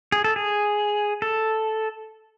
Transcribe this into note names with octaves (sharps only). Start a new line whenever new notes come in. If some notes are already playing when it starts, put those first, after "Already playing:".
G#4
A4
G#4
A4